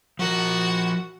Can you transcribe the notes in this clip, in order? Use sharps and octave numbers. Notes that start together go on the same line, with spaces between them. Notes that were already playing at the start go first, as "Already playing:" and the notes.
F3 F#4 A#4